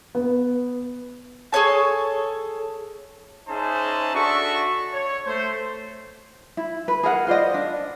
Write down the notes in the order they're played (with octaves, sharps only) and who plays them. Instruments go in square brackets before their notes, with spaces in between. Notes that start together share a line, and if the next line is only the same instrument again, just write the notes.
[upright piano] B3
[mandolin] G#4 A4 C#5 A5
[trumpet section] C#4 D#4 G#4 C5 E5 A5
D4 F#4 A4 D5 E5 C#6
C#5
A3 C5
[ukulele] E4
B4
G#4 A#4 F5 F#5
F4 C5 D5 D#5
D4